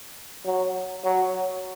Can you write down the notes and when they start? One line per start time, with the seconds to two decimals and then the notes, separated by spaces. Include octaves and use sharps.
0.45 F#3
1.05 F#3